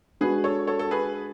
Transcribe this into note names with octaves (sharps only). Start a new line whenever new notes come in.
G#3 D4 F#4 G#4 B4
A4 C#5
A4 C#5
A4
G#4 B4